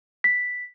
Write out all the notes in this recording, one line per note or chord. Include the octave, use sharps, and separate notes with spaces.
B6